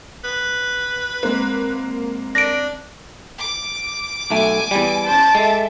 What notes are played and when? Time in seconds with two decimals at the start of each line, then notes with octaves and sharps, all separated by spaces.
0.24 B4
1.23 G#3 A#3 C4
2.35 D4 A#6 D7
3.39 D6
4.30 B1 A3 G#5
4.71 E2 G3
5.06 C#4 C5 A5
5.35 G#3 A4 E5